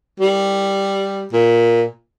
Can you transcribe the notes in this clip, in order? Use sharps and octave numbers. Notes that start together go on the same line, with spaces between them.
G3
A#2